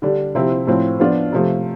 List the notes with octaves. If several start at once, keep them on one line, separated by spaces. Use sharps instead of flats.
D3 G3 D4
C3 F3 C4 E4
A2 F3 C4
F3 B3 D4 F4
C3 F3 A3